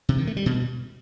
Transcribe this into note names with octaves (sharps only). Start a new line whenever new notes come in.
C3
D#3
A3
G3
B2